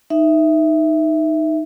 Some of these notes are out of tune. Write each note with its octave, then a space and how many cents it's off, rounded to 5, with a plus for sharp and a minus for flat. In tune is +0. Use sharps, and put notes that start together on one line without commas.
D#4 +0 E5 +0